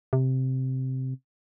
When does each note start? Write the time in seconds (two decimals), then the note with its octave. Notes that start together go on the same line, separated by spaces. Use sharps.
0.13 C3